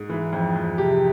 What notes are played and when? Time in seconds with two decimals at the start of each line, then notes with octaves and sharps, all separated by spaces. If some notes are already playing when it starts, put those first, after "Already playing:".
Already playing: G#2 G#4
0.10 E3
0.33 F2
0.56 F2
0.78 C3 G4